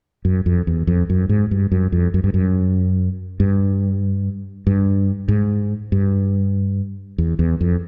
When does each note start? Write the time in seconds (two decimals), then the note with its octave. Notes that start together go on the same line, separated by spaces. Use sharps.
0.25 F#2
0.46 F2
0.67 E2
0.87 F2
1.10 F#2
1.29 G#2
1.51 G2
1.72 F#2
1.92 F2
2.14 F#2
2.24 G2
2.34 F#2
3.40 G2
4.67 G2
5.28 G#2
5.92 G2
7.18 E2
7.39 E2
7.61 F2